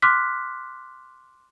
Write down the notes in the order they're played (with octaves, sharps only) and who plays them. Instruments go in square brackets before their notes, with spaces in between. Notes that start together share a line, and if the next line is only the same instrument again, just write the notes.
[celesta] C6 D6 F6 F#6 B6